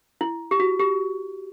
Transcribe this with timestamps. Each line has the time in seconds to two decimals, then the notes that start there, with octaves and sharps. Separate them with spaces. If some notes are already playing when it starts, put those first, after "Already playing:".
0.21 E4
0.51 G4
0.60 F#4
0.80 G4